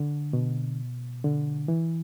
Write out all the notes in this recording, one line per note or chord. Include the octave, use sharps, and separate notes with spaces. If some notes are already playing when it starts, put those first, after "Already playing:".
Already playing: D3
B2
D3
E3